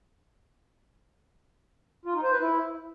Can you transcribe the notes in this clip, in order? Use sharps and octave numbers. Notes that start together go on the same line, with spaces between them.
F4
D#4
C5
B4
E4